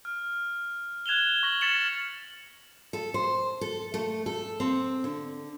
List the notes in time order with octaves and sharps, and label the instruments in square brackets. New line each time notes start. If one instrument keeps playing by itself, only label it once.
[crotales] F6
F#6 G#6 E7 F7 G7
C#6 A#6 F#7
F6 A6 B6 C#7 E7 F#7
[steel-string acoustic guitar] A4
C5
A4
A3
A4
C4
D3